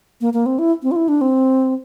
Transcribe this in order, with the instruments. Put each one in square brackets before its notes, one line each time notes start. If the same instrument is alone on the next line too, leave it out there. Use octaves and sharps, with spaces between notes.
[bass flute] A#3
A#3
C4
E4
C4
F4
E4
D4
C4